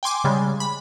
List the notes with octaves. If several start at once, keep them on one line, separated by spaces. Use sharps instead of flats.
G5 G#5 C6 D6
C#3 G3 G#3
B5